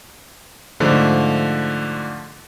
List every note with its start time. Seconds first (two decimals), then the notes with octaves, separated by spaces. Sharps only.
0.80 G#2 D3 F3 A3